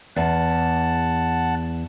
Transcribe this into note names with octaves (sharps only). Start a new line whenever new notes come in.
E2 F#5 A5